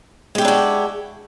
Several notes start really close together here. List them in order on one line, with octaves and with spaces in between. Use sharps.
G#3 G4 E4 D4 F#4